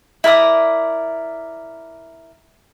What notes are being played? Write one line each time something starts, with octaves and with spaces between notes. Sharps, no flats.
E4 A#4 D5 D#6